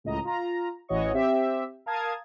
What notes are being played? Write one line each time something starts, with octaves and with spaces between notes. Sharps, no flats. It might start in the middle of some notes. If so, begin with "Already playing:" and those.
C#2 A2 D#5 A#5
F4 A#5
A1 E3 F#4 C#5 D#5 C#6
C4 G4 E5
A#4 F5 A5 D#6 G#6